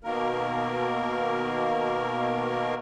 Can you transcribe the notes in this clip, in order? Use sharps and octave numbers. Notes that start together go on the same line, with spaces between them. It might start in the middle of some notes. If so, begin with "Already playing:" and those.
B2 D#3 A#3 A#4